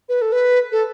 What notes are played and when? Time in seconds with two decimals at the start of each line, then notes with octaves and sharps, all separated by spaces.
0.09 B4
0.22 A4
0.32 B4
0.72 A4